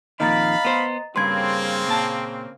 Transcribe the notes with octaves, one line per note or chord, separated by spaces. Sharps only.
F2 A#2 D#3 D#5 F5 A#5 B5 A6
B3 C5
G2 C#3 A#3 C4 B4 C6 G#6
A#2 A5